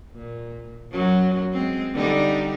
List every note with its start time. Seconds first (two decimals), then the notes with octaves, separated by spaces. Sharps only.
0.14 A#2
0.91 F#2 F#3
1.52 G#3 C4
1.93 D3 G3 D#4